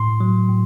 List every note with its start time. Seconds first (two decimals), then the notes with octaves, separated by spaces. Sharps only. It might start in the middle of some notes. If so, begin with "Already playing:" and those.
Already playing: A2 C6
0.20 F#3
0.49 A2